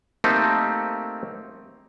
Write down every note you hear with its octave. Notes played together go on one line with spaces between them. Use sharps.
A3 A#3 C4 D#4 G4 A4